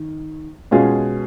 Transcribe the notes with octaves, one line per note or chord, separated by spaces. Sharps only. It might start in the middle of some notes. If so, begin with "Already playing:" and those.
Already playing: D#3
B2 G#3 C#4 F4 G#4